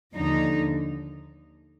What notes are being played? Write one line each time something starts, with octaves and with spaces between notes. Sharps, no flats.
D#2 D3 F3 D#4